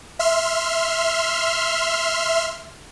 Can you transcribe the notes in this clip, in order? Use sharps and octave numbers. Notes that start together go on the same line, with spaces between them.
E5 C6 F6